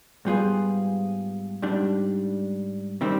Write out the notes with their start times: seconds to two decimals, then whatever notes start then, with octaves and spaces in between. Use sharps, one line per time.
0.25 G#2 G3 B3 F4 G#4
1.62 G#2 G3 D4
3.01 C3 D#3 G3 C4